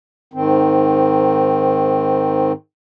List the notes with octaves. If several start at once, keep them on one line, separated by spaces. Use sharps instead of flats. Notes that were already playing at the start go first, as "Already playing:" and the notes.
G#2 D#3 C4